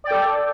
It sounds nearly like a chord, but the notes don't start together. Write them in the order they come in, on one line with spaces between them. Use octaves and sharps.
D5 G5 A4